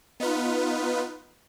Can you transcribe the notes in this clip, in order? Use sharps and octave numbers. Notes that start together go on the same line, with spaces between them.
B3 D#4 F4 B4